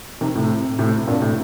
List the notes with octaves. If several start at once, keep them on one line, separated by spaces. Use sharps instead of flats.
C3 D#3
A2 C3
A2 C3
G2 A#2
A2 C3